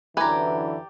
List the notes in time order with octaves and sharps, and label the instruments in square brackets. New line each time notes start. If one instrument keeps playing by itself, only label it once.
[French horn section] F#2 D3 E3 [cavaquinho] G4 D5 A#5 [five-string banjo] B4 G#5